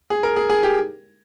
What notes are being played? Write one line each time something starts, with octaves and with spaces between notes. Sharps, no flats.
G#4
A#4
G#4
G#4
G4